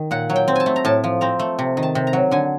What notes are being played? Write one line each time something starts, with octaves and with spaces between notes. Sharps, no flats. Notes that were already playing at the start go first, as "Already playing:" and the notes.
Already playing: D#3
A#2 F#5
F#3
G5
C4
G#5 A5
A3
A#5
A2 A5
F3
C4 A#5
A3
C3
D#3
A5
C3
A#5
F#3
D3 G#5